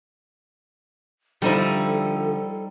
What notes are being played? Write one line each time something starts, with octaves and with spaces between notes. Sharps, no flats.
D3 F3 G3 D#4 E4 A4